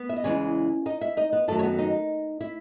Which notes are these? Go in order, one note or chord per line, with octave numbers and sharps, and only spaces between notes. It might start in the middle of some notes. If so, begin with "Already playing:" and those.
Already playing: B3 B4
E5
D#5
E2 C#3 E3 G#3 C#4 C#5
D#4 D#5
E4 E5
D#4 D#5
B3 B4
F#2 D#3 F#3 A3 A4
C#5
B3 B4
D#4 D#5
E4 E5